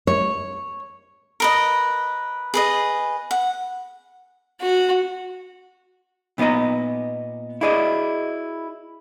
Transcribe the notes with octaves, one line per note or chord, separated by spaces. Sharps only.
C#5
A#4 B4 D#5
G#4 B4 D#5
F#5
F#4
A#2 B3 D#4 D#5 A#5
E4 F#4 G#4 D5 D#5